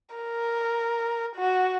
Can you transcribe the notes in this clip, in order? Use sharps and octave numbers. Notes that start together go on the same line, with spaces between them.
A#4
F#4